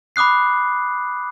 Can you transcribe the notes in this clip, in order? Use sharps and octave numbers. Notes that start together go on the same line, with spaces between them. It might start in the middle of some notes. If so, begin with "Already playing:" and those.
B5 D6 D#6 F#6 C7